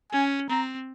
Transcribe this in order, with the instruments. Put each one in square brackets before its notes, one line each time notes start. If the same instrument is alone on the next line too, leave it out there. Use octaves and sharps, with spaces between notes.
[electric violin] C#4 [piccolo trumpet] G#5
[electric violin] C4 [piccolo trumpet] A#5